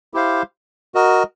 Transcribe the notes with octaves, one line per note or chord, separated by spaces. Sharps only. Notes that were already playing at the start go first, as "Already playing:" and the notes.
E4 G4 C5 F5
F#4 A#4 D#5